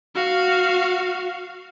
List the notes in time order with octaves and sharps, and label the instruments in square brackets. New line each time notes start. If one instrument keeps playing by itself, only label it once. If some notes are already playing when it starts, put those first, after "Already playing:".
[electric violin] F#4 F5